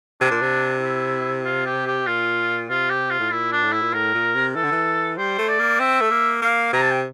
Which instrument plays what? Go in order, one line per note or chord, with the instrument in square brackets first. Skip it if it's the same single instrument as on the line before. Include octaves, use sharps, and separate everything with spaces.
[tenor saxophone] C3 [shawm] D4
[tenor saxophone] A#2
C3
[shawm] E4
F4
G4
G4
[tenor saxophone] A#2 [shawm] F4
[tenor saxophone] C3 [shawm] F4
[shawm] G4
F4
[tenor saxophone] A2
[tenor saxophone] A#2 [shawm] E4
[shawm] D4
[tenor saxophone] A2
[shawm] E4
[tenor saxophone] A#2
[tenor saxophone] A2 [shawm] A#4
[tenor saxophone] A#2
C3
[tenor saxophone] E3 [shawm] A4
[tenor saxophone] D3
E3
[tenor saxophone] G3 [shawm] C5
[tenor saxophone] A3
[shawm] D5
[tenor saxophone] A#3
[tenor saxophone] C4 [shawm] E5
[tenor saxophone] A3
A#3
[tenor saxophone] A#3 [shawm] F5
[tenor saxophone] C3 [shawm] A#5
[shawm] A5
G5